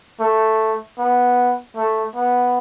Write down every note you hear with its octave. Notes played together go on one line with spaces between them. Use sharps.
A3
B3
A3
B3